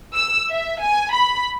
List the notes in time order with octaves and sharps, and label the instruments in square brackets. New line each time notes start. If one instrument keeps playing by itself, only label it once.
[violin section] E6
E5
G#5
B5